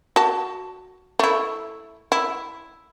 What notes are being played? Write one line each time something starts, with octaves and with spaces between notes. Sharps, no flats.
F#4 A5
A3 E4
E4